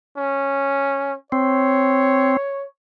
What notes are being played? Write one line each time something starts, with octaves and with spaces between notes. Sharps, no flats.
C#4
C4 C#5